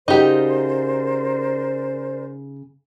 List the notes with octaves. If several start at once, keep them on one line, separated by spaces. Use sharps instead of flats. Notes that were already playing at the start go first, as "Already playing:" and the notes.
C#3 D#4 F#4 G4 A#4 C5 D5